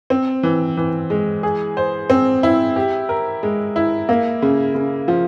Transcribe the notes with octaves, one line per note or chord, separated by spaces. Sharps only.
C4
E3
E3
G#3
G#4
C5
C4
E4
G4
A#4
G#3
E4
A#3
C#3
C#3
F3